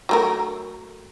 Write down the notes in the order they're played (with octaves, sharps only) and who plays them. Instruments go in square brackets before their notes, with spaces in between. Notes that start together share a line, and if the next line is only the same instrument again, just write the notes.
[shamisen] F#3 A3 A#4